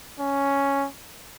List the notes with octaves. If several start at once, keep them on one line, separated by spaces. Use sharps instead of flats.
C#4